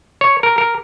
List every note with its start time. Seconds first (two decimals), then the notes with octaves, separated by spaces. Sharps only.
0.21 C#5
0.43 A#4
0.58 A#4